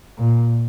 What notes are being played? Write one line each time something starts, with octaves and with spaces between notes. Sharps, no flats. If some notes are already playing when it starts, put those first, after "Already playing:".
A#2